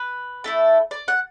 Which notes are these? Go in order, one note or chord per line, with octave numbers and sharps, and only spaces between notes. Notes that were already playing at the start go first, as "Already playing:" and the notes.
Already playing: B4
A3 E4 A4
D5
F#5